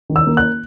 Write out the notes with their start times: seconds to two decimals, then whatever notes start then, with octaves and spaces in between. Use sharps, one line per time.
0.10 D#3
0.16 E6
0.27 A#3
0.37 F#6